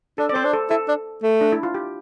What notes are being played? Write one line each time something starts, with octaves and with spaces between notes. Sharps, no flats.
D4 A4
D5
C4 C5
D4
A4
E4 A4
D4
A3
D4
E4
F4
G4